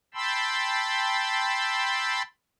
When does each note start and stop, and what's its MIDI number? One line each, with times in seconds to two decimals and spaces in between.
0.14 2.22 79
0.14 2.22 81
0.14 2.22 83
0.14 2.22 84
0.14 2.22 88